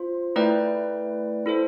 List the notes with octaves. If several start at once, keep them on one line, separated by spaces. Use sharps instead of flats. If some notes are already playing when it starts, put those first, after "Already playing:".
Already playing: F4 C5
A3 E4 B4 D5 G5
E4 A4 C5